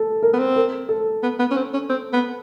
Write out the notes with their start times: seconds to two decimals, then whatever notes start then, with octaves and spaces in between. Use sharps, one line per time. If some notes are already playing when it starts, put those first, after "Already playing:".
Already playing: A4
0.23 A#4
0.34 B3
0.39 C4
0.56 A#4
0.89 A4
1.23 B3
1.39 B3
1.51 C#4
1.57 C4
1.74 C#4
1.89 C4
2.13 B3